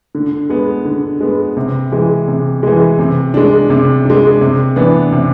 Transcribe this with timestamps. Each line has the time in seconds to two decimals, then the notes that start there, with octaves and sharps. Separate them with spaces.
0.15 D3
0.50 G#3 B3
0.85 D3
1.21 G#3 B3
1.57 C3
1.92 E3 G#3
2.28 C3
2.63 E3 G#3
2.99 C3
3.34 G#3 D4
3.70 C3
4.05 G#3 D4
4.41 C3
4.76 E3 B3 D4
5.12 C3